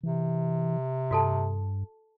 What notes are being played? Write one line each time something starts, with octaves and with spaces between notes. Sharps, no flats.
C3 E3
G2 F#4 A4 A5